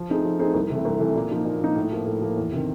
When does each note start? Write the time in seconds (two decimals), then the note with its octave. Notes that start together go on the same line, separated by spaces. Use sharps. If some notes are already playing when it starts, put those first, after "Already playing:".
Already playing: F3
0.09 A3 C4 D#4 G#4
0.24 F3
0.39 A3 C4 D#4 G#4
0.54 C2
0.69 C3 E3 A3
0.85 C2
1.00 C3 E3 A3
1.16 A#2
1.31 F3 A#3 D#4
1.45 A#2
1.61 F3 A#3 D#4
1.76 A2
1.91 F3 A#3
2.06 A2
2.21 F3 A#3
2.37 E2
2.52 C3 D#3